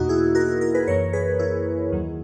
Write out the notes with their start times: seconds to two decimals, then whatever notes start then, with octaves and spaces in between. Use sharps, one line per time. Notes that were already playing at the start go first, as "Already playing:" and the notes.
Already playing: E2 B2 A#3 D#4 F#4
0.09 E4 G#4
0.35 F#4 A#4
0.48 F#4 A#4
0.61 F#4 A#4
0.74 G#4 B4
0.87 F#2 E3 A#3 A#4 C#5
1.13 G#4 B4
1.39 E4 G#4
1.92 D#2 D#3 F#3 A#3